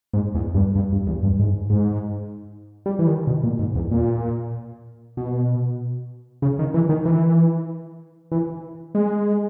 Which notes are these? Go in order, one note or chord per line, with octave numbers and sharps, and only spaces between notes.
G#2
E2
G2
G2
G2
E2
G2
G#2
G#2
G3
E3
D#3
B2
A#2
G#2
E2
A#2
B2
C#3
D#3
E3
D#3
E3
E3
G#3